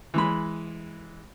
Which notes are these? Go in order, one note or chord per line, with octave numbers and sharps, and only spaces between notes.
E3 G#3 B5